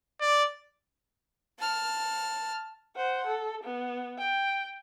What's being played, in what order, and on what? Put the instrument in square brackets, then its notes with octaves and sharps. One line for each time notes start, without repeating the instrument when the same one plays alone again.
[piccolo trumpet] D5
[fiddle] A5 F6
[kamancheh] C5 F#5
A4
B3
G5